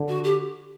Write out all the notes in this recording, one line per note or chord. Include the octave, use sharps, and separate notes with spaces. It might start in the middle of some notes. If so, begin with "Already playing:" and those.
Already playing: D3
F#4
G4